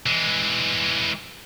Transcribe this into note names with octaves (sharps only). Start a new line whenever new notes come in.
E3 G#3